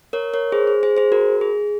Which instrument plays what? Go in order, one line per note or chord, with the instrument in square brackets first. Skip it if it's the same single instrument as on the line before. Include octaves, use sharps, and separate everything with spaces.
[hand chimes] A#4 C#5
A#4 C#5
G#4 C5
G#4
G#4 C5
G#4 C5
F#4 A#4
G#4